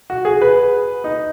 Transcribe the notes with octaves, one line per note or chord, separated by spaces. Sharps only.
F#4
G#4
B4
D#4